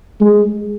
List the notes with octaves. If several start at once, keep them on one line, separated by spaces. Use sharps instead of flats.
G#3